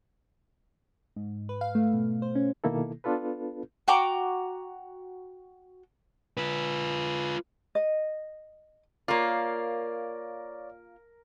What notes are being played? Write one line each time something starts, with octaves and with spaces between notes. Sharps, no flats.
G#2
B4
F5
A3
B2
C5
C#4
B2 D#3 A#3 E4 A4
B3 D4 F4 A4 B4
F#4 G5 A#5 D6
F4 B4
D#5
A#3 F4 A#4 C#5 D5